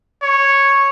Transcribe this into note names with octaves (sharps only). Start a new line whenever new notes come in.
C#5